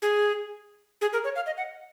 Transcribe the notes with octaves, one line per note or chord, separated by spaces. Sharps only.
G#4
G#4
A#4
C#5
F5
D#5
F#5